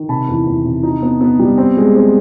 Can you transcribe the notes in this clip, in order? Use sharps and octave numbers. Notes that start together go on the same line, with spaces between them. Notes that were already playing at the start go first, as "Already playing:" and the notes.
Already playing: D#3
C3 A5 B5
E2
E2
C3
D#4
B3
B3
G3
C4
G#3
C4